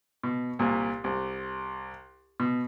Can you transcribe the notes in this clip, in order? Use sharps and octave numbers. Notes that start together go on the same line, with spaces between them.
B2
C2 A#2
C2
B2